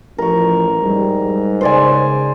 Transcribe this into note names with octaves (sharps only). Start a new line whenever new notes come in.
A1 F3 A#4 C#6
G#2 G3
C#3 C5 D5 G#5